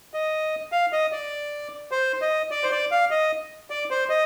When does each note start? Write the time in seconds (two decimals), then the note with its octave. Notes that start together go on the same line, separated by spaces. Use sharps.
0.14 D#5
0.72 F5
0.93 D#5
1.12 D5
1.92 C5
2.22 D#5
2.51 D5
2.63 C5
2.71 D5
2.91 F5
3.11 D#5
3.70 D5
3.90 C5
4.10 D#5